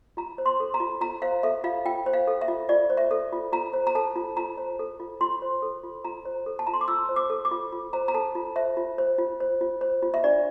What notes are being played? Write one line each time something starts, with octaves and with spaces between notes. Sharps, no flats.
F4 A#5
C5
C6
A4
A#5
F4
F4 A#5
C5 F5
A4 E5
F4 F5
F4 G5
C5
F5
A4
E5
F4
F4 D5
C5
E5
A4
F4
F4 A#5
C5
A#5
A4 A5
F4
F4 A#5
C5
A4
F4
F4 C6
C5
A4
F4
F4 A#5
C5
A4
A5
F4 A#5
C6
D6
F4 E6
C5
D6
A4
D6
F4
F4
C5 A#5
A#5
A4 A5
F4
C5 E5
F4
C5
F4
C5
F4
C5
F4
E5
D4 D5